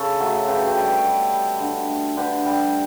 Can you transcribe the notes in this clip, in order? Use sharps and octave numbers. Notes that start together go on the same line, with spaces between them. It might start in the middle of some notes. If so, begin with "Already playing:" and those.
Already playing: C#3 A4 C#5
F#3 A3
C#3 G4 B4
G4 B4
G3
G4 B4
C#5
B2 G4 B4
G3
D3
A3
D3 G4 B4
G3